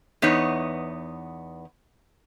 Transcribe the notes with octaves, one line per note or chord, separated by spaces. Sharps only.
E2 B3 D#4 C#5